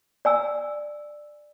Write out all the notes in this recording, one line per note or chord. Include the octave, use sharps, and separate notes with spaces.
D5 G#5 E6